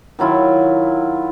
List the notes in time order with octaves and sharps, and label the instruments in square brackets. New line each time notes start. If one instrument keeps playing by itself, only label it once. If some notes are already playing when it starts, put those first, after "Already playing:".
[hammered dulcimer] D#3 F#3 E4 F4